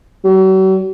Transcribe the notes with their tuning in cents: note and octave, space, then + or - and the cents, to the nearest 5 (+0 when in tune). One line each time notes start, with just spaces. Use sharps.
F#3 +45